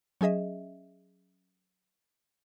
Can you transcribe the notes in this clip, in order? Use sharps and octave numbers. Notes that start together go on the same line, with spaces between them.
F#3 C#4 G#4 D#5 E5